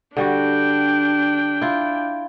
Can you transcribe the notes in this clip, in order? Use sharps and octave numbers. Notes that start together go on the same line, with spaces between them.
D3 G3 D4 F#4 G5
E4 F4